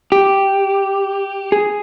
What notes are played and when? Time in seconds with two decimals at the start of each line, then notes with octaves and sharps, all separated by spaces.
0.12 G4
1.52 G#4